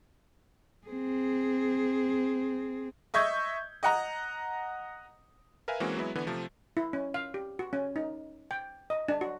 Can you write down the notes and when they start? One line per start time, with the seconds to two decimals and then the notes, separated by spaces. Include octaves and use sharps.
0.87 C4 G#4
3.14 D#5 E5 C#6 G6 G#6
3.83 D#5 F#5 A#5
5.68 A#4 B4 E5 F5 G#5
5.80 E3 G#3 A#3 C4 C#4 F#4
5.97 F#3 G#3 B3 E4
6.15 D3 E3 B3
6.27 C3 F3 A3
6.77 E4
6.93 C#4
7.14 F5
7.34 G4
7.59 F#4
7.73 C#4
7.96 D#4
8.51 G5
8.90 D#5
9.08 D4
9.21 F#4